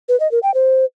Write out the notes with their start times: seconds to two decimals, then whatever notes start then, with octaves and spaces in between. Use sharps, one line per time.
0.09 B4
0.20 D#5
0.31 A#4
0.43 G5
0.54 C5